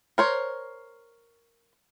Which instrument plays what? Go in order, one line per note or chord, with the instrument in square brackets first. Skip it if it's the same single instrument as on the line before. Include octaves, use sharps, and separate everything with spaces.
[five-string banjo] A#4 C5 C#5